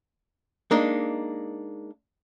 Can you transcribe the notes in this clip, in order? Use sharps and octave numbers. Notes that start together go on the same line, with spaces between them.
G#3 A#3 D4 D#4